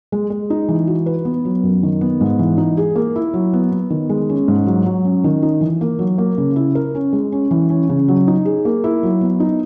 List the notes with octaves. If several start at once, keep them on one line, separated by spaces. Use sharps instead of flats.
G#3
G#3
D#4
E3
F#4
B4
B3
F#3
F#2
D#3
B3
G#2
E3
D#4
G#4
A#3
E4
F#3
B3
B3
D#3
G#3
C#4
G#2
F#3
F#3
C#4
D#3
D#4
E3
A#3
F#3
A#3
C#3
E4
A#4
C#4
G#3
C#4
E3
C#4
C#3
F#3
D#4
G#4
A#3
E4
F#3
B3
D#4